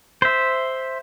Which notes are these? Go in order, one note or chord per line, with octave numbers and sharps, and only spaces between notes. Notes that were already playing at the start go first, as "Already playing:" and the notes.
C5 E5